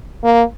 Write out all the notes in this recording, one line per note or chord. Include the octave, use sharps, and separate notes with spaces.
A#3